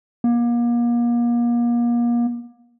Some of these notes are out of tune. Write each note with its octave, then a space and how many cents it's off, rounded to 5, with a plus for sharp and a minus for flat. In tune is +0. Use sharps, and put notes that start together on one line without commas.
A#3 +35